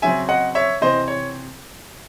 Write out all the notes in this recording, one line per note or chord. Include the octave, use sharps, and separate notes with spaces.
C#3 F#3 C4 E5 G#5
D#5 F#5
C#5 E5
C3 E3 C4 C5 D#5
C#5